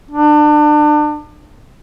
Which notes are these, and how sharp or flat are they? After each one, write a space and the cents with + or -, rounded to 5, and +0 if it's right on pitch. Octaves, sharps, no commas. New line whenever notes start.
D4 +30